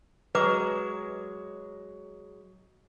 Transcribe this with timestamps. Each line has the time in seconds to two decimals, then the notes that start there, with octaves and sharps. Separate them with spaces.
0.35 F#3 G#3 B4 D6